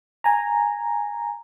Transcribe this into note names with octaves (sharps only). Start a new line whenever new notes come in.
G#5 A#5